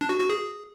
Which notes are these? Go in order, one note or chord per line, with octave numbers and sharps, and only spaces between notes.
D4
F#4
F#4
G#4